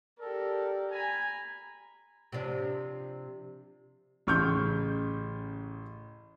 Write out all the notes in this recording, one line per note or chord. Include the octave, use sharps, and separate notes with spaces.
G4 A4 A#4 D5
G#5 A#5 B5
C3 F3 D4
A1 C#3 C#6 F6 G6